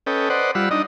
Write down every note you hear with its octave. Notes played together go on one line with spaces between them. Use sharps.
C#4 A4 B4 D#5 G5
B4 C5 D5 D#5 F#5
G3 F4 F#5 B5 E6
D4 D#4 D#5